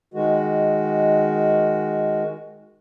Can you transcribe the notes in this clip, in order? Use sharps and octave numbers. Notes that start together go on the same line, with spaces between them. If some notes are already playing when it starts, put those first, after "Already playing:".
D#3 G#3 F#4